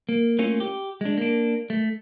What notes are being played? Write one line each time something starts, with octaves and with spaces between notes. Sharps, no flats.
A#3
A3 A#3 C#4 F4
G4
G#3 D4
A#3 D4
A3